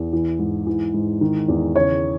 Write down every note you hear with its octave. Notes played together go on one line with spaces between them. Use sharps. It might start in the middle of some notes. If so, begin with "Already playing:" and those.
Already playing: E2
E3
G#2
E3
G#2
D#3
E2
C#3 C#5